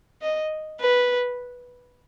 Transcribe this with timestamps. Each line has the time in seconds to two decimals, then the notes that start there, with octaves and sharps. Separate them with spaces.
0.22 D#5
0.80 B4